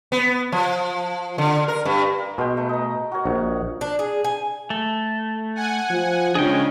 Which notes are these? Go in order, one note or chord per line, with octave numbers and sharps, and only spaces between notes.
B3
F3
D3
A#4
G2
A#4
B2 G#3 B4 G5
A3 B4
D#5 A#5
F#4 A#4 C#5
A#1 F#5
D4
G#4
G#5
A3
F#5 G#5
F3
C#3 G#3 C#4 D4 G#4 D#5 G5